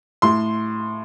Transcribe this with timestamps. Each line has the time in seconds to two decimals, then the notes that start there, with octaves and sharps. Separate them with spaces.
0.22 A2 C6